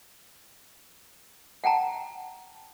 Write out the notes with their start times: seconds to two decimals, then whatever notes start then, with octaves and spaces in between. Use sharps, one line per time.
1.64 F#5 G5 A5 A#5